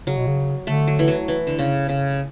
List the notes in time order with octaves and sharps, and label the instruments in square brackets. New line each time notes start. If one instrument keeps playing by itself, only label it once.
[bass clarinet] C#3 [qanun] F#3
[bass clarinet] B2
C#3
[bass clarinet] D3 [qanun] A3
[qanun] F#3
E3
F#3
E3
D3
C#3
C#3